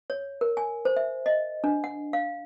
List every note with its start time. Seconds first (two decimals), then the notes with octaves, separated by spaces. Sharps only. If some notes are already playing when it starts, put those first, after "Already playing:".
0.10 C#5
0.41 A#4
0.57 G#5
0.85 C5
0.96 E5
1.26 D#5
1.64 D4
1.84 F#5
2.13 F5